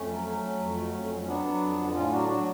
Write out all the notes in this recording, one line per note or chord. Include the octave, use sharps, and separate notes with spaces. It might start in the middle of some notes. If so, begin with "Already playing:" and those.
Already playing: F2 A3 C#4
F#3
F#3
F#3
F2
F#3
F2
F#3
C#4
F#3 B3 D4
F#3
F2
D3
A2 C#4 F4
F#3 D4 F#4
F#3 D4 F#4